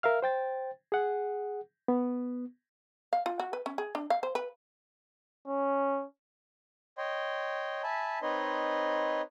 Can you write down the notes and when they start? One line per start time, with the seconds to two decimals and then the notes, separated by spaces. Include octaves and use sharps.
0.03 A#4 E5 F5 F6
0.22 C5 G5 A6
0.92 G#4 F#5
1.88 B3
3.13 F5
3.26 F4
3.40 F#4
3.53 B4
3.66 C#4
3.78 G#4
3.95 D4
4.10 F5
4.23 C5
4.35 B4
5.47 C#4
6.98 C#5 D#5 G5 C6
7.83 E5 G#5 A5 B5
8.22 C4 D#4 B4 C#5 D#5 C6